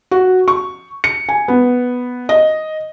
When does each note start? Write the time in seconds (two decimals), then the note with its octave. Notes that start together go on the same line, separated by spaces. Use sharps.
0.11 F#4
0.48 C#6
1.04 C#7
1.29 G#5
1.48 B3
2.29 D#5